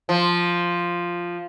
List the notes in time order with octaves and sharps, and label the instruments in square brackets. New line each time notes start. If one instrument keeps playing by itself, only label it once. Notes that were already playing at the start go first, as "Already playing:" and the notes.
[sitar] F3